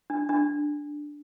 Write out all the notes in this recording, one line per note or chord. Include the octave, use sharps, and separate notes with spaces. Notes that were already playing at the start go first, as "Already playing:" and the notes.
D4
D4